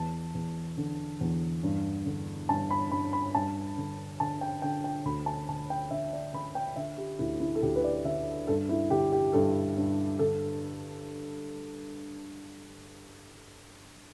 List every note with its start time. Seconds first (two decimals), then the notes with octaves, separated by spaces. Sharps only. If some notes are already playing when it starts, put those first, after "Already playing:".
Already playing: E2 A5
0.34 E2
0.77 D3
1.21 E2
1.63 G2
2.06 D3
2.49 G2 A5
2.70 B5
2.91 G2 B5
3.13 B5
3.35 G2 A5
3.77 D3
4.20 D3 A5
4.41 G5
4.62 D3 G5
4.84 G5
5.05 D2 B5
5.26 A5
5.48 D2 A5
5.70 G5
5.91 D3 E5
6.13 D5
6.33 D3 B5
6.55 G5
6.76 D3 E5
6.98 G4
7.19 D2 E4
7.40 E4
7.55 A4
7.62 D2 G4
7.76 B4
7.84 D5
8.05 D3 E5
8.47 G2 A4
8.69 E4
8.90 D3 G4
9.12 G4
9.33 G2 A4
9.77 G2
10.19 D3 A4